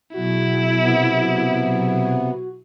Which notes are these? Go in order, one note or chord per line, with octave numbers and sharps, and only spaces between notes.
B2 F#3 E4 F#4 G#4
C3 B3